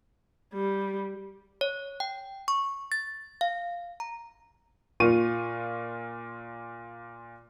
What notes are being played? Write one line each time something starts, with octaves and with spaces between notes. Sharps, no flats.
G3
C#5
G5
C#6
A6
F5
A#5
A#2 F4 F5 C#6 D#7